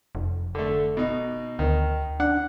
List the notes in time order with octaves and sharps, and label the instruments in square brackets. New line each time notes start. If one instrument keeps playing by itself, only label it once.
[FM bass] F1
[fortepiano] D3 A3
B2 D#4
[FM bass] D2 [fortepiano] D#3
[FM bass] D4 [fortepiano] F#5